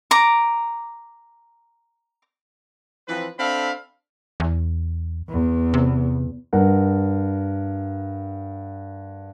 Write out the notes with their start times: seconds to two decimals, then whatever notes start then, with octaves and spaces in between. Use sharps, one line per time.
0.11 A#5 D6
3.08 E3 F3 C4 B4
3.39 C4 D4 A4 E5 F5 B5
4.40 E2
5.29 E2
5.74 C3
6.53 G2 A#4 F#5